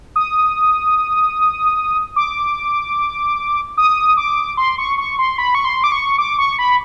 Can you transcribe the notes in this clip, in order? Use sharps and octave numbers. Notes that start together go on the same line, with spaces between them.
D#6
D6
D#6
D6
C6
C#6
C#6
C6
B5
C#6
C6
D6
C#6
D6
C#6
B5